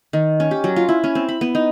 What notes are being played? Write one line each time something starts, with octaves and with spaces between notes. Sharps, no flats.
D#3
C#4
G4
F#3
F4
E4
C#4
C4
B5
B3
D#4